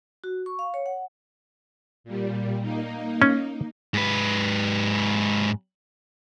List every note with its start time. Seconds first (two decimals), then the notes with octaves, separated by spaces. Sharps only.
0.24 F#4
0.46 C#6
0.59 F5
0.74 C#5
0.86 F#5
2.04 A#2 G3
2.61 A#3 D#4
3.22 C#4
3.94 G#2 B4